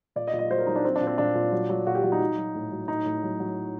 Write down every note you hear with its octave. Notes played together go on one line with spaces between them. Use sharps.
A#2 D5
D#5
A#2
D#5
F#3 C5
A#4
F#3 D#4
D4
F#3 C4
D4
A#2
C4
A#2 D4
A#2
F#3
F#3
A#2 F#4
G4
F#3 F#4
D#4
F#3
F#3
A2
F#3
A2 D#4
A2
F#3
F#3